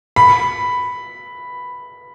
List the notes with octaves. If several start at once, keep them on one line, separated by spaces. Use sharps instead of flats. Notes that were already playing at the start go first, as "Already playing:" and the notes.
B5